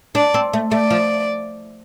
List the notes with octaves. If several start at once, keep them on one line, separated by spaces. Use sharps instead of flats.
D4 D5
C4
A3
A3 D5
F3